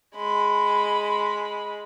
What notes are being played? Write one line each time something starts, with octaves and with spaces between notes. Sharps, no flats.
G#3 B5